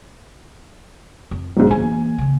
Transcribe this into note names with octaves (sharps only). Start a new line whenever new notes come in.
F2
B1 G#2
E3 A#3 G#5
C#3 A#3